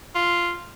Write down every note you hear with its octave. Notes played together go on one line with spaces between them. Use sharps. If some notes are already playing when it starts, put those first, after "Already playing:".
F4